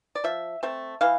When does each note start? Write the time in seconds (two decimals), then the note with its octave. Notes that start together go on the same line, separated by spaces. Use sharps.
0.15 D5
0.24 F3 E5
0.63 A3 C4 E5
1.01 E3 F5